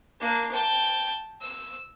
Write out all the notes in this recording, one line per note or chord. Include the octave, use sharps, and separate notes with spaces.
A#3 D4
G5 A5
E6